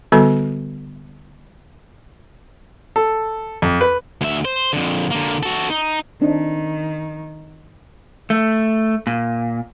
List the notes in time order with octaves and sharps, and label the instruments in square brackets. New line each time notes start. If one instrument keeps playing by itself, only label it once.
[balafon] D3 G3 B3 F#4 A4
[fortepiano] A4
F2
B4
[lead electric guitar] D2 E5
C5
F2 D3
D3 A#3
F#4 A4
D#4
[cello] D#3 [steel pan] C4 D4 D#4
[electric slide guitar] A3
A#2